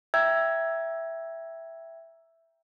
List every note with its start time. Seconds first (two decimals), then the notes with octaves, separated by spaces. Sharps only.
0.14 E5 G5 A#5 E6 G6 G#6